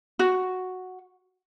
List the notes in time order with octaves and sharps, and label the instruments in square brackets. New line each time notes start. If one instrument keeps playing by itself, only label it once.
[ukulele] F#4